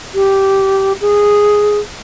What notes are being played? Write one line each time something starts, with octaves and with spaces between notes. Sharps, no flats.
G4
G#4